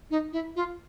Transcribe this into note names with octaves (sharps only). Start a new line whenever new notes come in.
D#4
E4
F4